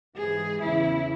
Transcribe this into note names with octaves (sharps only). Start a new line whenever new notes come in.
G#2 E3 G#4
E2 C#3 E3 E4